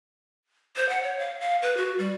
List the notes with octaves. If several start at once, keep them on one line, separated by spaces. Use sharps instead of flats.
C5
F#5
C#5
F5
F5
B4
F#4
G3